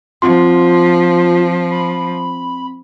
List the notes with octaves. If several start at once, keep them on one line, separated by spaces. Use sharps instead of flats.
F3 C4 F4 C6
B5